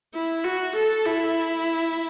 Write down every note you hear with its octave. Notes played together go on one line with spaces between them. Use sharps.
E4
F#4
A4
E4